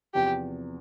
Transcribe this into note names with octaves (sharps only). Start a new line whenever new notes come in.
E2 C3 F3 G4